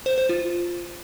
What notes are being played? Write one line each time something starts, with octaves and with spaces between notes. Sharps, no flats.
C5
C5
F4